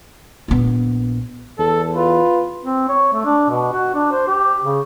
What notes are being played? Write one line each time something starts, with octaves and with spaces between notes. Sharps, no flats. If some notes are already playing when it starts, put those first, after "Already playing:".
A#1 B3
E2 A4
F4 B4
C4
C#5
A3
D4
B2
F#4
D4
C5
G4
C#3